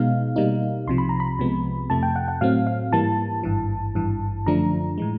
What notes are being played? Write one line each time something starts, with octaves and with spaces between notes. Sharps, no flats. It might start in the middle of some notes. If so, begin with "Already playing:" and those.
Already playing: B2 G#3 B3 D#4 F5
B2 G3 A#3 D#4
C2 C3 F3 C6
B5
A#5
B5
C2 C3 F3 G#3 B3
F2 C3 F3 A3 A5
G5
F#5
F#5
A2 F#3 A3 C4 F5
F5
G#2 E3 G3 A#3 A5
G#1 G2 E3
G#1 G2 E3
F#2 D3 F3 A3 D4 A#5
A2 E3 G#3